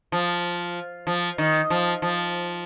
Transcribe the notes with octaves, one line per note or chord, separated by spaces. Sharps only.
F3
F3
D#3
F3
F3